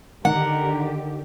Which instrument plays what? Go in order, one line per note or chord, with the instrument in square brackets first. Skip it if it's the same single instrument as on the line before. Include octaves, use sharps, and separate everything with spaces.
[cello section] D3 G4 [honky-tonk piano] D#3 [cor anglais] A#4 [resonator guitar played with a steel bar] F#5